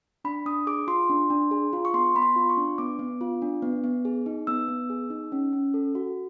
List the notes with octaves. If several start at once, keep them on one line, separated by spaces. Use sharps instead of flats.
D4 B5
D4 D#6
G#4 D6
F4 C6
D4
D4
G#4
F4
C#6
B3 C6
B3 B5
C6
F4
C#6
D4
B3 D6
B3
F4
D4
B3
B3
G#4
D#4
B3 E6
B3
G#4
D#4
C#4
C#4
A4
F#4